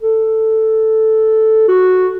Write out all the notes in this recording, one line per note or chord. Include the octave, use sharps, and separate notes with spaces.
A4
F#4